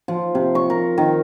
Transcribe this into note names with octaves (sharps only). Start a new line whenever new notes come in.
F3
C3
C#6
A#4
D#3